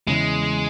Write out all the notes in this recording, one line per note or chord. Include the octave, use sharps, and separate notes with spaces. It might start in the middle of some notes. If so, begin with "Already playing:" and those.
E2 C#3 E3 G#3